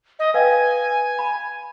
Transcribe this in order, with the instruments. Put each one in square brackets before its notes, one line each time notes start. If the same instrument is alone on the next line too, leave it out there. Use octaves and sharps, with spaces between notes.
[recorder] D#5
[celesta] B4 F5 G5 [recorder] G#5
[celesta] B5